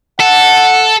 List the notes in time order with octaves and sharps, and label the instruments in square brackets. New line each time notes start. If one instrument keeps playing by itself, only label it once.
[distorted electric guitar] A4 [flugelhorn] F#5